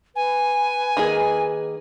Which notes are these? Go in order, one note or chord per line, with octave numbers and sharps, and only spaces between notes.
B4 G#5
D#3 A#3 G#4